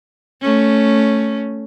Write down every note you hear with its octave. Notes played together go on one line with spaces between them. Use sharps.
A3 C#4